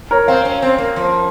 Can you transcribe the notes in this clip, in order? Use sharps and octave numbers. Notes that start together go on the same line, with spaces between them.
A#4 C#5
C4 C#5 F5
C#4
C4
A#3
F3